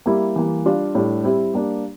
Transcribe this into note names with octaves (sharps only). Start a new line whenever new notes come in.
G3 A#3 E4 G4
E3 G3 A#3
G3 D4 F4
A2 G3 D4
G3 C4 E4 G4
G3 A#3 D4